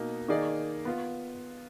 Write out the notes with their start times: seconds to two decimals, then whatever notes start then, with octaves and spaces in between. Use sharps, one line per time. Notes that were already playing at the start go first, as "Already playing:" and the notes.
Already playing: B2 A#3 D#4
0.28 D#3 A#3 D#4 G#4 D5
0.85 B3 F4